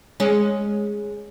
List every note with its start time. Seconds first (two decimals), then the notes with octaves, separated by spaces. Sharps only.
0.20 G#3 C#4